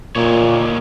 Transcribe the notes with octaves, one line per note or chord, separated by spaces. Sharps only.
A#2 A#3 D#4 C#5